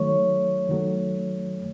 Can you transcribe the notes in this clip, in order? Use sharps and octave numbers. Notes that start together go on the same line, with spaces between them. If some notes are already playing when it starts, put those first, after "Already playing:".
Already playing: D#3 F#3 A3 C#5
D#3 F#3 A3